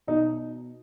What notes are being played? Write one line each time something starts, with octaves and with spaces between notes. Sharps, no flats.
B2 D#4